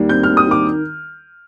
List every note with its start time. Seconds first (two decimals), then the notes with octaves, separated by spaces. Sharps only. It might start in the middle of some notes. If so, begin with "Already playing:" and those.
Already playing: D#2 D#3 G3
0.09 C4 G6
0.23 F6
0.28 D#2
0.37 D#6
0.47 D#3 D6